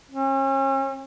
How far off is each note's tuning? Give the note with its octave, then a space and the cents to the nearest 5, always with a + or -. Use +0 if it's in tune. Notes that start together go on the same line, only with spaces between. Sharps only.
C#4 -40